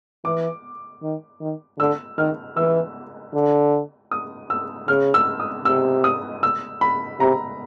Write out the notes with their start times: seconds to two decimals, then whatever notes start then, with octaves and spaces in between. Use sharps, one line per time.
0.25 E3 D6
1.02 D#3
1.41 D#3
1.79 D3 E6
2.18 D#3 F6
2.56 E3 E6
3.34 D3
4.11 D#6
4.50 E6
4.88 C#3 F6
5.14 E6
5.40 D#6
5.65 C3 E6
6.04 D#6
6.43 E6
6.81 B5
7.20 C3 A#5